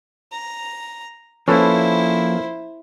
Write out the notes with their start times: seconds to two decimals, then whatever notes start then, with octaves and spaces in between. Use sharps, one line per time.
0.32 A#5
1.48 F3 A#3 C#4 E4 A4 B4 C5